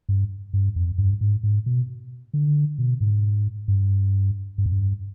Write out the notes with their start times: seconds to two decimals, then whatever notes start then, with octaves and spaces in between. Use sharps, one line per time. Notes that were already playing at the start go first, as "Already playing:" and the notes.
0.09 G2
0.53 G2
0.76 F2
0.98 G2
1.21 G#2
1.43 G#2
1.66 B2
2.34 D3
2.78 B2
3.01 G#2
3.68 G2
4.58 G2
4.66 F2
4.72 G2